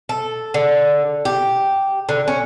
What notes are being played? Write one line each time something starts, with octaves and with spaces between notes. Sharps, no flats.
A4
D3
G4
D3
C#4